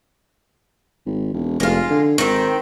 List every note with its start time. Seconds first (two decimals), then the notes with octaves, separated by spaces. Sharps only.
1.06 G#1
1.34 E1
1.60 F1 G#3 F4
1.90 D3
2.18 G#1 D#3 C4